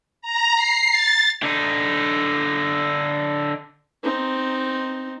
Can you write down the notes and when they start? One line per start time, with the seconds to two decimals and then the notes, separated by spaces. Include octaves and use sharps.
0.22 A#5
0.55 C7
0.91 A6
1.43 D3 D#4
4.03 C4 D#4